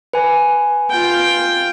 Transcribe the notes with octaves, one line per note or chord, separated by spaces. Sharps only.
B4 G#5
F4 G5